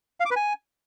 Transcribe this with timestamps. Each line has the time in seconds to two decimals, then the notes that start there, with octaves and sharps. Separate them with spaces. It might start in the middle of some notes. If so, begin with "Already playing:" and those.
0.20 F5
0.25 D6
0.31 B4
0.36 G#5